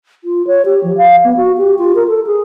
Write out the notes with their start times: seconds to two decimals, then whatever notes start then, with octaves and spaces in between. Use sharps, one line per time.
0.24 F4
0.47 C#5
0.65 G4
0.83 F3
0.97 F5
1.24 B3
1.37 F#4
1.57 G4
1.78 F4
1.95 A#4
2.08 A4
2.26 G#4